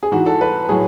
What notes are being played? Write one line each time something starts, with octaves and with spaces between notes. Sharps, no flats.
G#4
G#2 E3 F#4
A4
B4
A2 F#3 G#4